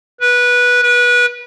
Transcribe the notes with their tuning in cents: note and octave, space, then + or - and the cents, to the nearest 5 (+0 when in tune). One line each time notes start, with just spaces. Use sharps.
B4 -15
B4 -25